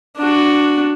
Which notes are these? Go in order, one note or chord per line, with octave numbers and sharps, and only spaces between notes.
D4 F#4